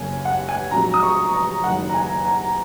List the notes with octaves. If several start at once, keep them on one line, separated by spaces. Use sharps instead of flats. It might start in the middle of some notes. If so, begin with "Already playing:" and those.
Already playing: F#1 F#2 C#3 A#3 C#4 G#5
F#5
G#5
A#1 G#2 F#3 C#4 A#5
D#6
C#6
A#5
F#1 F#2 D#3 F#3 F#5
A#5
G#5
A#5